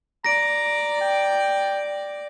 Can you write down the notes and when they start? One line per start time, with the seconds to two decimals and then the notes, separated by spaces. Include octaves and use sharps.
0.25 D5 A#5 D6 A#6 D7
1.01 G5